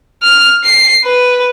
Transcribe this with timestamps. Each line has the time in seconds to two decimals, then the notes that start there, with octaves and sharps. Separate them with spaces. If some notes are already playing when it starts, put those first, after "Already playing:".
0.23 F6
0.64 C7
1.05 B4